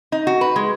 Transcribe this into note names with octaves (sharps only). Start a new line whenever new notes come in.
D#4
F#4
B4
G#3